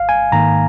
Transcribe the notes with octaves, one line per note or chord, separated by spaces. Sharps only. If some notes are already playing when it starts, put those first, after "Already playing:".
Already playing: G#1 F5
G#5
G#2 D#3 A#3 A#5